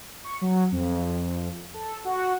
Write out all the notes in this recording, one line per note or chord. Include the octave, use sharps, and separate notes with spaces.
C#6
F#3
F2
A4
F#4